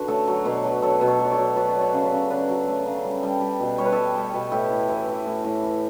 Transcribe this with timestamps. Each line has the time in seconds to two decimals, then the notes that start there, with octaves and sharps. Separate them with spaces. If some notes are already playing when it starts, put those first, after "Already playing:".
Already playing: D3 F#4 B4
0.08 A3 A4 C#5
0.27 F#3
0.45 B2 B4 D5
0.64 F#3
0.82 F#3 A4 C#5
1.01 B2
1.07 A4 C#5
1.19 F#3
1.25 D5
1.32 A4 C#5
1.38 F#3
1.56 F#3 B4 D5
1.69 D5
1.75 F#3
1.81 A4 C#5
1.93 C#3
2.05 B4 D5
2.12 C#3
2.30 C#3 B4 D5
2.49 F#3
2.67 A3
2.86 C#3
3.05 G3
3.23 G3
3.41 G3
3.60 B2
3.78 G3 C#5
3.86 B4
3.92 G3 A4 C#5
4.15 G3
4.34 B2
4.52 A2 E4 G4
4.71 A2
4.89 E3
5.08 E3
5.26 A2
5.44 A2
5.63 E3